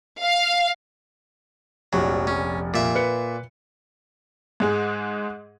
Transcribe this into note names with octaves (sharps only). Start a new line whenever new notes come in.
F5
F1 A#1 F#3
C#4
A#2 E5
B4 C#7
G#2 G#3 G#4